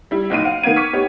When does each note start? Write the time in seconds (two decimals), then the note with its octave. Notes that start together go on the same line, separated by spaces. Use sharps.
0.11 G3 E4
0.30 F#1 B1 D#4 D7 D#7
0.45 F5 F#5
0.63 D#3 A#3 B3 F5 G#6 D#7
0.76 C#6 D6 F6 G#6 B6 C#7
0.93 B3 D#4 G4 C#5